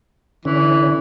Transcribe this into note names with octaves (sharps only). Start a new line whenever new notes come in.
D3 E3 C#4